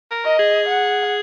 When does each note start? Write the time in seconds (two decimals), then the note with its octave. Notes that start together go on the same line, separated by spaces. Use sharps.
0.11 A#4
0.25 D#5
0.39 G#4
0.67 F#5